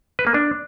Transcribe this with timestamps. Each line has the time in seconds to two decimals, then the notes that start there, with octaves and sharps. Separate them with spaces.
0.19 B4
0.27 A#3
0.34 D4